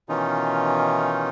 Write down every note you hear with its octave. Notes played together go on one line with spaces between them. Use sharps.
B2 D#3 E3 C#4 D#4 F4